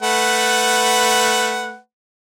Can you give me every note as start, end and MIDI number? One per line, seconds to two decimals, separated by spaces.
0.02 1.77 57
0.02 1.77 71
0.02 1.77 78